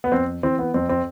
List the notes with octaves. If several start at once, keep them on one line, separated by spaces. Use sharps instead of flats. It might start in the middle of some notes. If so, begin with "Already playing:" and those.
B3
F2 C4
E3 C4
B3
F2 C4
C4